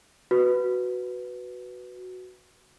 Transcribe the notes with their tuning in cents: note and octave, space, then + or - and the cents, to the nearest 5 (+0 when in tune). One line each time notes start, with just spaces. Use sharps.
F#4 +0 B4 +0